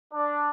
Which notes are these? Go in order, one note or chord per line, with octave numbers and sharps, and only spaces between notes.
D4